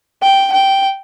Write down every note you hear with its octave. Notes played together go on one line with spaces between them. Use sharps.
G5
G5